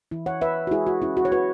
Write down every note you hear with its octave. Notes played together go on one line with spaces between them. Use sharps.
E3 E4
C#5 F#5
E4 B4 E5
F#4
G#3 E4 G#4
F#4
C#4 E4
F#4
C#5
E4 F#4 B4